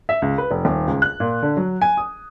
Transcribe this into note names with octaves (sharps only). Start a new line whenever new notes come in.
E5
C#2
B4
F1
D#1
C#2
F#6
A#2
D3
F#3
G#5
D#6